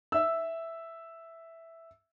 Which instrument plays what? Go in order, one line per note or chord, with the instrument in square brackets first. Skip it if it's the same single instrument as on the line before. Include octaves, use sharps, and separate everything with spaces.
[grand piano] E5 E6